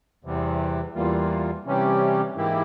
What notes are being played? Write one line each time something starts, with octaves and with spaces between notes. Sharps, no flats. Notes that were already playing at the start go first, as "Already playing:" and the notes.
E2 C3 E3 G3
E2 E3 G3 A#3 F4
C3 E3 G3 C#4 G4
G#2 E3 A#3 E4 G4